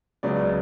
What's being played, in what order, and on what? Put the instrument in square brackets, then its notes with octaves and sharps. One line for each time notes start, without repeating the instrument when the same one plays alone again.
[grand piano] C#2 C#3 F#3 B3 D5
D5